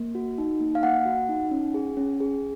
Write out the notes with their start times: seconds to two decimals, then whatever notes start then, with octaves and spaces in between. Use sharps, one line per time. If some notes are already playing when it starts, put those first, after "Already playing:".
Already playing: A#3
0.15 F#4
0.38 D#4
0.60 A#3
0.75 F5
0.83 A#3 F#5
1.06 F#4
1.29 D#4
1.51 C#4
1.74 G#4
1.97 C#4
2.20 G#4